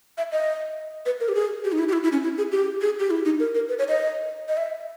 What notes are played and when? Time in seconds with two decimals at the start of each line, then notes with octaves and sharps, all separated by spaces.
0.18 E5
0.32 D#5
1.06 B4
1.20 A#4
1.29 G4
1.35 G#4
1.64 G4
1.72 D#4
1.79 E4
1.88 G4
1.93 E4
2.03 E4
2.12 C#4
2.23 E4
2.38 G#4
2.52 G4
2.81 G#4
2.99 G4
3.10 E4
3.25 D#4
3.40 A#4
3.55 A#4
3.69 B4
3.79 C#5
3.89 D#5
4.49 D#5
4.57 E5